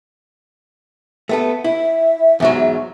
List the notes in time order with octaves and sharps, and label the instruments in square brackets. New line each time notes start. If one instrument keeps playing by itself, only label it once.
[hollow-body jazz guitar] A3 B3 A4
[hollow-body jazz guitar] E4 [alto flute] E5
[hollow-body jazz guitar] E2 G#2 F#3